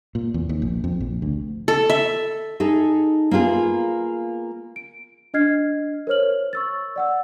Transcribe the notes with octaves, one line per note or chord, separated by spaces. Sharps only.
A#2
E2
D#2
A#1
F2
A#1
D2
A4
E5
D#4 G#4 A4
A#3 B3 F4 G#4
D7
D4 D#5 F6 G#6 C7
A#4 C5 C#5 F6 F#7
C#6 E6 A6
D5 F#5 E6